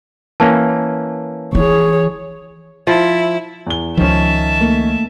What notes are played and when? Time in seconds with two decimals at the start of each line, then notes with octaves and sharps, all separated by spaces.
0.40 E3 A#3 C#4 A5
1.55 E3 G#4 C#5
2.87 F3 E4
3.67 E2 G7
3.97 C#2 D#3 F3 C#4 E5 A5
4.61 A3 A#3